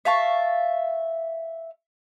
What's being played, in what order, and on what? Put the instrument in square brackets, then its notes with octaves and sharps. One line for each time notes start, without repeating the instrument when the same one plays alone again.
[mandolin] E5 F5 A5 C#6